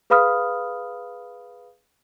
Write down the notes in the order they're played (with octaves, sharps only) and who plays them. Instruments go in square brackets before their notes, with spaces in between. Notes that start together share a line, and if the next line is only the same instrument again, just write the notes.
[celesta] G#4 B4 F5 B5 D#6 F6